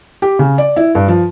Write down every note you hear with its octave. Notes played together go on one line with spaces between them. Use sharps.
G4
C#3
D5
E4
G2
F3